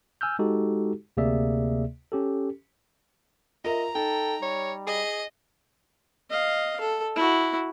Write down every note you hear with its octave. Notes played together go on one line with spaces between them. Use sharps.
G#5 E6 F6 G6
G#3 D#4 F#4 G4 A4
D2 C3 A#3 G#4 D5 E5
C#4 G4 A4
F4 A#4 D#5 E5 A#5
D#4 A4 G5
G3 C#5
G#4 D#5
D#5 F5
A4
E4 F#4